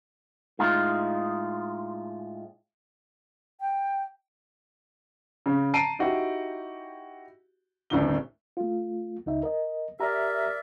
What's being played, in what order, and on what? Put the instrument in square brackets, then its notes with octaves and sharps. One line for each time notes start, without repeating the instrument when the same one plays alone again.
[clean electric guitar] A2 G#3 D#4 F4
[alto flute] G5
[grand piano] C#3
A5 A#5 C7 D7 D#7
D#4 E4 F#4 G4
D#1 C2 A2 D3 G7
[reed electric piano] A3 F4
C#2 D#4 E5
A#4 D#5
[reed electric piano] G4 A#5 [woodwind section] A#4 D5 E5